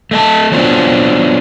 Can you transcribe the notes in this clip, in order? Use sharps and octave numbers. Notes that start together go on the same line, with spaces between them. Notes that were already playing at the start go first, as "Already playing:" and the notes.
A3 D#5 A5
F#3 B3 C4 D4 F4 F#4